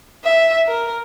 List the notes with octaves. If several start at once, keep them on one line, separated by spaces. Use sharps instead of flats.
E5
A#4